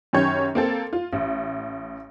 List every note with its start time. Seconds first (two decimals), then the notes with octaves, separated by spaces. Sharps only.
0.13 F#2 D#3 C#4 G4 C#5 G6
0.55 A#3 C4 A4
0.93 F4
1.13 A1